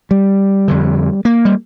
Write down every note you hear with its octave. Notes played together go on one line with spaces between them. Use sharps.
G3
F2 D3
A#3
G3